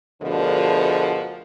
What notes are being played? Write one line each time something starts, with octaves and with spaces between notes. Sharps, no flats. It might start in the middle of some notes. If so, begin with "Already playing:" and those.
D2 B2 D3 F3 G#4 A#4